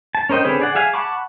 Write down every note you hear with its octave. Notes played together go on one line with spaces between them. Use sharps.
A5
C#4 A#4 C5 D#5 G5
D3 C4 C#4 G#4 B4
G#4 D5 F#5
G#4 E5 F5 G#5
F#5 A5 B5 C#6 D6